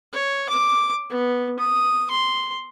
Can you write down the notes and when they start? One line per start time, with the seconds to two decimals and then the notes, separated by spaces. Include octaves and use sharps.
0.13 C#5
0.49 D6
1.10 B3
1.59 D#6
2.11 C6